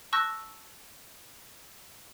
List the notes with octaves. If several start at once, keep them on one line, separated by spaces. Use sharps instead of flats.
A5 C#6 E6 F#6 G6 A#6